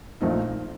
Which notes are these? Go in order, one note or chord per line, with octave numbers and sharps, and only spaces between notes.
A#1 A#2 A3 C4 D#4